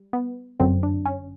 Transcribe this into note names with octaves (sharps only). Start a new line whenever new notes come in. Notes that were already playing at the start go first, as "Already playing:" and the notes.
Already playing: G3
B3
G1 F#2 D3 F#3 C4
D4
C#4